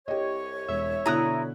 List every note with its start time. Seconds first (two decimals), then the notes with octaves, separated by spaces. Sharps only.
0.08 C2 G4 C#5 D#5
0.68 E1 E5
1.06 B2 D3 E4 A#5 D#6 F#6